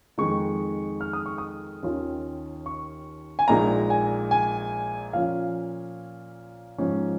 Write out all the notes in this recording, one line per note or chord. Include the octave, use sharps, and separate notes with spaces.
F2 D#3 G#3 D#4 C#6
F6
D#6
C#6
D#6
D#2 D#3 C#4 F4
C#6
G#5
A#1 A#2 G#3 D#4 A#5
G#5
G#5
A#2 F3 C#4 F4 F5
G#2 F3 C#4